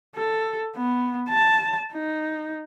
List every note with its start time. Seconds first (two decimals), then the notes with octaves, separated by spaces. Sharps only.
0.16 A4
0.76 B3
1.30 A5
1.93 D#4